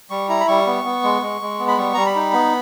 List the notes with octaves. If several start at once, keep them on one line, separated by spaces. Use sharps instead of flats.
G3 C#6
E4 A#5
B5
G3 C#6
B3
B3
G#3
G#3
G#3
B3
B5
G3 C#6
G3 A#5
B5
D#4
B3